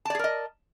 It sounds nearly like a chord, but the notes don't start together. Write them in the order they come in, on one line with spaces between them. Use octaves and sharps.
A5 D5 G#4 A#4 D#5